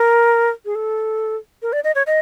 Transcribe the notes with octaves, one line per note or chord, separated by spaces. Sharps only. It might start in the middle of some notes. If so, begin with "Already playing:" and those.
Already playing: A#4
G#4
A4
A#4
D5
D#5
C#5
D#5